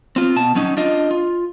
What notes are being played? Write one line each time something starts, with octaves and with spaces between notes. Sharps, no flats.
C4 F4
B2 A5
F#3 C#4 D#4
D4 F4 D#5
F4